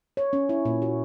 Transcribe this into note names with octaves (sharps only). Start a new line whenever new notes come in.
C#5
C#4
E4
A#2
F#4